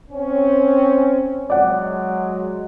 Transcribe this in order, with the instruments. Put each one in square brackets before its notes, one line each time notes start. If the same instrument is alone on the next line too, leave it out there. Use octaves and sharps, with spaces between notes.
[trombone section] C4 C#4
[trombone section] F#3 G#3 [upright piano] D5 F#5